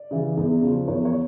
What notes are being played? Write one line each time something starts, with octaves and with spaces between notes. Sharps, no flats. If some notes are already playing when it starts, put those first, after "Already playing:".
Already playing: D5
C#3 E3
E2
C#3 F3
E2 C#5
C#5